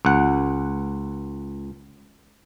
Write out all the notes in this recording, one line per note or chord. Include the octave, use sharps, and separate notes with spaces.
C#2 F#5